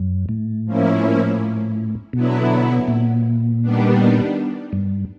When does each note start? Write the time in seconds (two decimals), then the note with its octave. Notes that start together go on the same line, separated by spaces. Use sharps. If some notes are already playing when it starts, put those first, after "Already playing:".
Already playing: F#2
0.29 A2
0.65 F3 A#3 C#4 E4
2.13 B2 D3 F#3 B3 E4
2.88 A#2
3.61 D#3 G3 B3 D4
4.73 G2